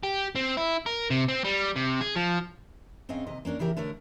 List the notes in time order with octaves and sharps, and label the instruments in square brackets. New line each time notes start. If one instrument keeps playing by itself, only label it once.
[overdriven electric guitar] G4
C4
E4
A#4
C3
C4
G3
C3
G#4
F3
[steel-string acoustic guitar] G#2 C4 C#4 D#5 F5
D#2 C3 D#5
A#3 C#4 D4 A#4
C#3 E3 G4 A#4
D3 A3 A#4 C#5